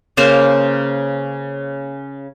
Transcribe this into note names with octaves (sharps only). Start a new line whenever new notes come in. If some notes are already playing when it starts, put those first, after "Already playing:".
C#3 A#3 C5 C6